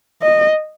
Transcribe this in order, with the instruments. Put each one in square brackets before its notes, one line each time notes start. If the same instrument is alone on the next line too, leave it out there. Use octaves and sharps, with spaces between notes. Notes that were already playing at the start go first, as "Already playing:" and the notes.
[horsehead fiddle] D#5